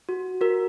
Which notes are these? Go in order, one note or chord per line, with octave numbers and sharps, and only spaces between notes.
F#4
F#4 A#4